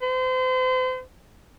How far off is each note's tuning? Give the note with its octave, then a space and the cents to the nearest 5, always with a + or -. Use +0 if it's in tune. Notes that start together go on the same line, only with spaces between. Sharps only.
C5 -35